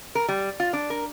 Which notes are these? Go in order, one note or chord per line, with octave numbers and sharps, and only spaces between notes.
A#4
G3
F4
D4
A#4